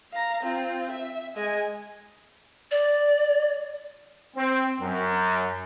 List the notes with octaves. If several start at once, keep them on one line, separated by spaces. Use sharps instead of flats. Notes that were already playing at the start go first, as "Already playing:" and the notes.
F5 A#5
C4 F4
E5
G#3 G#5
D5
C4
F#2